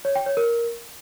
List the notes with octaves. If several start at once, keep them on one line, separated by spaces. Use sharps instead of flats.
C#5
G5
C#5
A#4